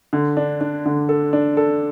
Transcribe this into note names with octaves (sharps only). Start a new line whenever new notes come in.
D3
D4
D4
D3
A4
D4
A4